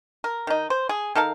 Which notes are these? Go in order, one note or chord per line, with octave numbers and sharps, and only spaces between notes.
A#4
D#3 D#4
C5
G#4
D#3 A4 A#4 F5